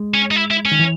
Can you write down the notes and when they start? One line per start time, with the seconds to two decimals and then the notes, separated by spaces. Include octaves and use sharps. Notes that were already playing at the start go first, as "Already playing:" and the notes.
Already playing: G#3
0.14 C#4
0.31 D#4
0.36 E4
0.51 E4
0.65 C#4
0.72 D#3
0.79 E3